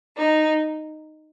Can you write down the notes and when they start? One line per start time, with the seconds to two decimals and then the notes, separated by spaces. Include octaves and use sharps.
0.16 D#4